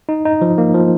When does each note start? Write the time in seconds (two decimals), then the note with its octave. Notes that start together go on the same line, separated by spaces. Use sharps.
0.09 D#4
0.25 D#4
0.42 F3
0.58 A#3
0.74 F3